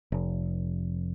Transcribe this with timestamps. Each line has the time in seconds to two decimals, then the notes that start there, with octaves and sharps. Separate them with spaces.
0.12 F1